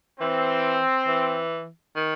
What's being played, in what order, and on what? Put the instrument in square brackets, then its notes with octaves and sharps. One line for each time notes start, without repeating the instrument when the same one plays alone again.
[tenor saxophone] E3 [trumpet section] C4
[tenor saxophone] E3
D#3